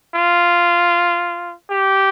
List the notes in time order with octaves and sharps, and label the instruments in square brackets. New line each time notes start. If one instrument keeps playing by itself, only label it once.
[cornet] F4
G4